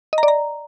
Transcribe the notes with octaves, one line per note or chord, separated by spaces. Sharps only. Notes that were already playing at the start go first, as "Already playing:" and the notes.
D#5
A#5
D5
A#5